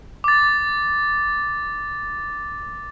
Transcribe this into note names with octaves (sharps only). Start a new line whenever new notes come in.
D6 A6